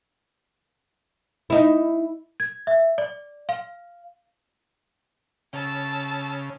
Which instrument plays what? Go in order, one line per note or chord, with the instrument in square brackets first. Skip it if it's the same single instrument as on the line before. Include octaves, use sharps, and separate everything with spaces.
[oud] D#4 E4
[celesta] G#6
E5
D5
F5
[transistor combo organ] C#3 [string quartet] A5 E6